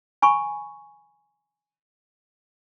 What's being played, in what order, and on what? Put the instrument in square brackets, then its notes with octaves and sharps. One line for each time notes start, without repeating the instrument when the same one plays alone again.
[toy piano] G#5 B5 C#6